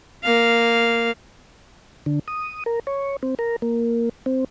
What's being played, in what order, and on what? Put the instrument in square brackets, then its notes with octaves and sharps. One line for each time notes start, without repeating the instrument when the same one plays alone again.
[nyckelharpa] A#3 F5
[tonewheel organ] D3
D#6
A#4
C#5
C4
A#4
A#3
C4